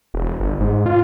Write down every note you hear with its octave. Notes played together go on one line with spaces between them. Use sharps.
E1
G1
G#2
F4